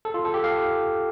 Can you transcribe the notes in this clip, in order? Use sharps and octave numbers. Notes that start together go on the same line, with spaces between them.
A4
F4
A4
G4
F5